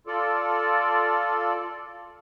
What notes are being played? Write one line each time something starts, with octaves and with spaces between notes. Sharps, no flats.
F4 A4 D5